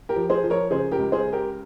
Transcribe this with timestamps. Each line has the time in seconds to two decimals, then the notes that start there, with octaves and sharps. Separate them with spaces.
0.09 G4 A#4
0.16 F3
0.30 G#4 C5
0.44 F3
0.50 A#4 C#5
0.71 C#3 G#4 C5
0.92 G4 A#4
0.99 C#2
1.12 G#4 C5
1.26 C#3
1.33 G4 A#4